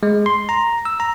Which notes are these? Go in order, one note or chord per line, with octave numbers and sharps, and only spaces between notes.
G#3
C6
A#5
E6
A#5